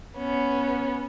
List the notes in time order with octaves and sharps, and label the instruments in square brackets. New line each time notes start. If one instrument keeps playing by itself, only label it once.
[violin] B3 C#4